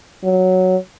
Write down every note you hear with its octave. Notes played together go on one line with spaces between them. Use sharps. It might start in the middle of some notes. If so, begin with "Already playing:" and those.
F#3